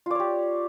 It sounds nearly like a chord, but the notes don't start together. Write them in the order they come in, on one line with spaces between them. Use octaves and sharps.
F4 D5 C#5 G4